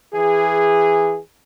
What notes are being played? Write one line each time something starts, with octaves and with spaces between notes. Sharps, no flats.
E3 G#4